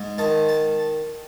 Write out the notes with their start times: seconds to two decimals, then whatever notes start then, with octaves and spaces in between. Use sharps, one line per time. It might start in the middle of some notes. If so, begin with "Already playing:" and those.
Already playing: G#2
0.18 D#3 A5
0.49 A5